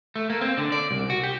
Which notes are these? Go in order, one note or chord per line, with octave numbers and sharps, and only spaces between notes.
A3
A#3
C4
D3
D5
C2
F#4
G4